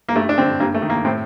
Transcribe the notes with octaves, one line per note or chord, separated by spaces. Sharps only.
A#3
G2 A3
D4
D3 C4
G2 A#3
A3
D#3
A#3
A2 C4